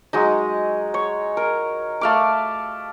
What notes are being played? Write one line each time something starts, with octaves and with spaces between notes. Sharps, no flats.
F#3 G#3 D#4
C#5
A#4
A3 F5 D6